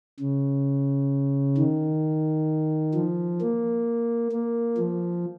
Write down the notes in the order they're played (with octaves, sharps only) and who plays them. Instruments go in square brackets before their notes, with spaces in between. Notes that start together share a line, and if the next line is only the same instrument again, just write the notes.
[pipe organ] C#3
D#3
F3
A#3
A#3
F3